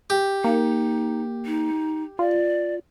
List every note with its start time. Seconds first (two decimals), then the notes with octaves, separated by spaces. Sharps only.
0.10 G4
0.44 A#3 D#4
1.46 D#4
2.19 F4 D5